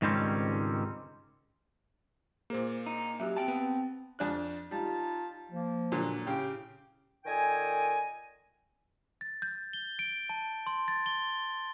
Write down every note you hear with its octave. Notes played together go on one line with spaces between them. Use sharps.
C#2 G#2 D#3 G3 C4 C#4
A#2 A#3 G#4 C5
D#4
F#2 F#3 G4 E5
C4 G5 A5
B3
F2 D4 F#6
G3 D#4 F4 A5
F3 A#3
A#2 D3 F#3
A2 C#3 G4 G5
A#2 D#3 A4 D#5 G5 G#5
A6
G6
G7
D7
A5
C6
A6
G7